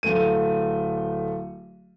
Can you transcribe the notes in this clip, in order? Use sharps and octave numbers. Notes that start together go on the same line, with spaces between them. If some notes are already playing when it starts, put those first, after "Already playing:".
D1 A3 D#7